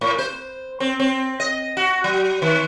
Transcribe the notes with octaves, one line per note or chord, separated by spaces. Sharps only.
A2
C5
C4
C4
D#5
F#4
F#3
D#3